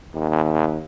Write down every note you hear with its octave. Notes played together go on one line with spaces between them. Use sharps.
D#2